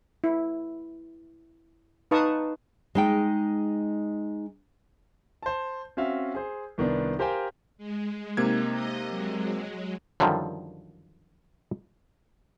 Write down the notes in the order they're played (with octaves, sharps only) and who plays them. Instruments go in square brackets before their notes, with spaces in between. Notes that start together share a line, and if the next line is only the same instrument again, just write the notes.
[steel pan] E4
D#4 B4 F5 A5 C#6 D#6
[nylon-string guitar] G#3 D#4 G5
[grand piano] C5 A5
C4 C#4 F#4 E5 F5
G#4 C5
C2 D#3 B3 D4
G4 A#4 C5 F5 G5 G#5
[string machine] G#3
[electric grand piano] C3 A#3 G#6 [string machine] D#4
[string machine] D#5
F#3 G#3
[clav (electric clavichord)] F#2 D3 D#3 F3 G3 F4